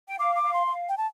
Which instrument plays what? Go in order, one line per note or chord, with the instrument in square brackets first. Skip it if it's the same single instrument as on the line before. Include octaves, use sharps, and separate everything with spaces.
[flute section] G5
[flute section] F5 [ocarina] D6
[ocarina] D6
[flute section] F5
[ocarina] C6
[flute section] F5
[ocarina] G5
A5